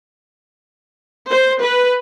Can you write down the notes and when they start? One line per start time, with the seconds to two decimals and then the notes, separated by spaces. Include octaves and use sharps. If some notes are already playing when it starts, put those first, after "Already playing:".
1.27 C5
1.60 B4